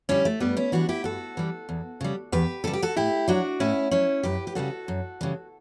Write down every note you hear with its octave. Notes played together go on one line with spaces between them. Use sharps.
D3 G3 C#4 E4
A3
G2 G3 B3
C#4 E4
E3 G3 D4 F#4
E4 G4
G2 F#4 A4
E3 G3
E2
C#3 G3
E2 G4 B4
C#3 G3 A4
G4
F#4 A4
A2 E4 G4
F#3 D4 F#4
A2 C#4 E4
F#3 C#4 E4
F#2 G4 B4
G4
C#3 E3 G3 F#4 A4
F#2
C#3 E3 G3